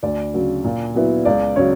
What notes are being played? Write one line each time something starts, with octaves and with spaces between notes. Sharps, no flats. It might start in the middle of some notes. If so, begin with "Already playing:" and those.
D2 D5
C#3 F#3
A#2
F#3 B3 E4
C#2 D5
C#3 F#3 C#5